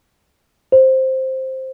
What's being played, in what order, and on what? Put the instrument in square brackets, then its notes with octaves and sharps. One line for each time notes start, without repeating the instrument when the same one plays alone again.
[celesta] C5